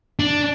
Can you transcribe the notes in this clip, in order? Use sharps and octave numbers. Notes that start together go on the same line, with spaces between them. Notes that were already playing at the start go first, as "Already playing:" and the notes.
D4